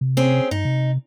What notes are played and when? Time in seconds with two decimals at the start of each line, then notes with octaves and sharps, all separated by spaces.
0.01 C3
0.17 C4 C#4 G#4
0.51 G2 D#4
0.65 C3